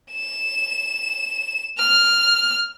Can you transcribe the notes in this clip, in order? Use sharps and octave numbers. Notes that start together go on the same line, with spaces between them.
E7
F6